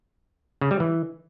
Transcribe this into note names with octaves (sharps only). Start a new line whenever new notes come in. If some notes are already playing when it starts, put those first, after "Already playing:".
C#3
G3
E3